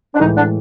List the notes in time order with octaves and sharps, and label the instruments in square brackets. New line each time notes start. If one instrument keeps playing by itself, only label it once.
[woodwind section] D4
[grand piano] A2 E3 G#3 [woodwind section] D#3 D#4
[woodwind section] D3 D4